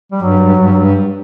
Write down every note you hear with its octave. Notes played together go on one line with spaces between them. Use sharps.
G3
G2 F#3
G2
G2
G2